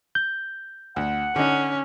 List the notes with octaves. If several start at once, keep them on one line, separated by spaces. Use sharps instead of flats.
G6
D2 F#5
D3 C#4 D#4